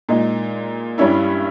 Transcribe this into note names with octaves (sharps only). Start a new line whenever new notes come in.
A#2 G#3 D#4
G2 G3 C#4 E4